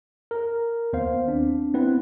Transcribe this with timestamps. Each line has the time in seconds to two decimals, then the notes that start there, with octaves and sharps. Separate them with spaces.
0.31 A#4
0.93 D#2 B3 C5 F5
1.28 C4 D4
1.74 B3 C4 E4 B4